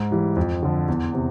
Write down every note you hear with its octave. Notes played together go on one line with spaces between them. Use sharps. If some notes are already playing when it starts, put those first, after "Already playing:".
Already playing: G#2
E3 G3
F2
D3 F3
E2
C3